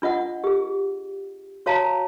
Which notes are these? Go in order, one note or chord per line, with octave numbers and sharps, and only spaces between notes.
D4 F4 D#5 F#5
G4 G#4
F#4 C#5 F5 A5 A#5